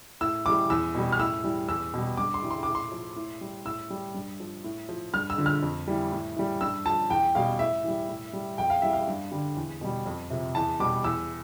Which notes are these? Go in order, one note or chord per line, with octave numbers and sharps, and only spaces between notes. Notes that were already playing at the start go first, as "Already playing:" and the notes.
A2 E6
E3 G3 D6
E2 E6
B2 G3
F6
A2 E6
E3 G3
E2 E6
B2 G3
G2 D6
C6
E3 G3
C6
A2 D6
C6
F3
A2
G3
A2 E6
G3
G2
F3
A2
F3
G2 F6
E6
D3 F3
F6
F2
E3 G3
A2
E3 G3
G2 E6
F3 A5
E2 G5
B2 G3 F5
A2 E5
E3 G3
A2
G3
F2 G5
F5
E3 G3 E5
F5
G2
D3 G3
E2
B2 G3
F2
C3 F3
E2 A5
B2 G3 D6
E2 E6